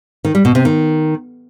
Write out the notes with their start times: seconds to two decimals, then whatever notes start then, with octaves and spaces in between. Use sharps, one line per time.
0.25 D#3
0.35 G3
0.45 B2
0.55 C3
0.65 D#3